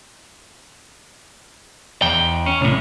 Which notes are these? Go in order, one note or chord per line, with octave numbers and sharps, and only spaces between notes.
E2 G5
C#4
C2 A2